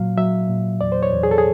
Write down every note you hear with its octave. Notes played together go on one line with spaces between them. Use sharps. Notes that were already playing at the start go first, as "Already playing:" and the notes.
Already playing: A#2 F#3 F5
F#3 E5
A#2
E2 D5
C5
C#5
E2
G#4
A4
G#4